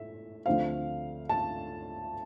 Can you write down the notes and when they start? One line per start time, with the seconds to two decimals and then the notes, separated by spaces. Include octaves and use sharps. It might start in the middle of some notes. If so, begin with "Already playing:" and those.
Already playing: A2 E5
0.46 D2 D3 F3 A3 C4 F5
1.29 A5